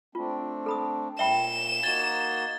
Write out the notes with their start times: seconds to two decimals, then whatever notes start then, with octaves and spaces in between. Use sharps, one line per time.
0.15 A3 C4 D4 F4
0.66 A4 B5 D#6
1.19 A#2 E5 G5 B5 E7 G7
1.83 A#3 D#4 F#4 G#6 A6 G7